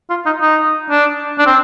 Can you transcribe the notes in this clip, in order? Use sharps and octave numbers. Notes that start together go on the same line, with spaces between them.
F4
D#4
D#4
D4
D4
C4